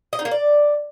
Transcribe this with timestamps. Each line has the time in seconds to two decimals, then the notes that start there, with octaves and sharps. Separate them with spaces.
0.13 D#5
0.19 D#4
0.25 A#3
0.31 D5